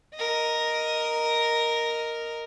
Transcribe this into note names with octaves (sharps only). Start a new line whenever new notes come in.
A#4 D#5